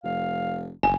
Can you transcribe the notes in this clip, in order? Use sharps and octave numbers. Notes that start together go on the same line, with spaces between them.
F1 F5
F#1 G#5